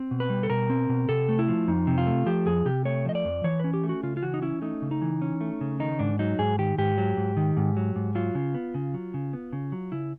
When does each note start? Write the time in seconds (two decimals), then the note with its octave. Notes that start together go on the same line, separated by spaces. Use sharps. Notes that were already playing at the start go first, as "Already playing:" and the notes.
Already playing: C4
0.11 B2
0.20 B4
0.30 G3
0.43 A4
0.50 B2 A#4
0.70 C4
0.89 B2
1.09 C3 A4
1.29 A3
1.39 E4
1.48 F3
1.68 F2 D#4
1.87 C3
1.98 F4
2.07 A3
2.26 F3 G4
2.46 F2 G#4
2.66 C3 G4
2.85 A3 C#5
3.05 F3 D#5
3.15 D5
3.25 F2
3.44 E3 C#5
3.60 C#4 B4
3.74 G4
3.83 A3
3.89 F#4
4.03 C#3 F4
4.17 F4
4.23 E3 F#4
4.34 D#4
4.42 C#4 E4
4.62 A3 D#4
4.82 C#3
4.91 D#4
5.02 E3
5.22 C#4
5.41 A3
5.61 C#3
5.80 D#3 D#4
5.99 G#2 D4
6.19 F#3 D#4
6.39 G#2 G#4
6.58 D#3 G4
6.78 G#2 G4
6.98 F#3
7.17 G#2
7.37 D#3
7.57 G#2
7.77 F#3
7.96 G#2
8.15 F#3 F4
8.35 C#3
8.54 B3
8.74 C#3
8.94 F#3
9.14 C#3
9.33 B3
9.53 C#3
9.72 F#3
9.92 C#3 E4